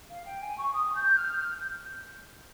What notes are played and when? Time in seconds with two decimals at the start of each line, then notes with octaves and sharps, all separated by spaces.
0.10 F5
0.25 G5
0.42 G#5
0.58 C#6
0.74 D#6
0.95 G6
1.17 F6
1.38 G6